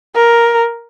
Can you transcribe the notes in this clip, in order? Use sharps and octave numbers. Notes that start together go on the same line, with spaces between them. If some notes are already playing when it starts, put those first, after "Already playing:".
A#4